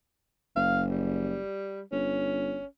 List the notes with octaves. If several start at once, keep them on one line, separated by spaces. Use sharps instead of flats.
F#1 F5
G3
G1 C#4